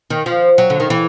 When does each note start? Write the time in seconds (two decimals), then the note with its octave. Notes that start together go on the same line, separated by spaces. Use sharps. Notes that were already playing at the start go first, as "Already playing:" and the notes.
0.10 D#3
0.26 F3
0.58 F#3
0.70 D3
0.80 D#3
0.90 E3